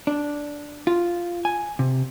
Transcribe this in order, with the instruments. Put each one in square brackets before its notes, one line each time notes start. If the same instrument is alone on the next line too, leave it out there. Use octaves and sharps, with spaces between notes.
[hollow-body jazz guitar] D4
F4
G#5
C3